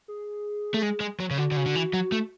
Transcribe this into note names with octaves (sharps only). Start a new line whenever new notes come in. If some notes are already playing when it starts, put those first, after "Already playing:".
G#4
A3
G#3
G#3
F#3
C#3
D3 F#4
D3
C#3
D3
E3
F#3
A3